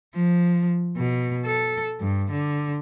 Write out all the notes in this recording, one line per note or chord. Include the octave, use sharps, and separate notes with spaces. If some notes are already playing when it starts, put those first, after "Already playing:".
F3
B2
A4
G2
D3